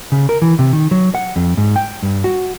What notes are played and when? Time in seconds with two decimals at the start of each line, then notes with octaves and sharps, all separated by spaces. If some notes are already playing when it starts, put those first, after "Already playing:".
0.12 C#3
0.29 A#4
0.42 E3
0.59 C3
0.73 D#3
0.91 F#3
1.15 F#5
1.36 F2
1.57 G#2
1.76 G5
2.03 G2
2.24 F#4